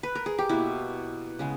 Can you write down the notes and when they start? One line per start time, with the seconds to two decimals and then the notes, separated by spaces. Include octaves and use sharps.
0.03 B4
0.15 A#4
0.26 G#4
0.38 G4
0.49 B2 A#3 E4
1.39 C#3 G#3 B3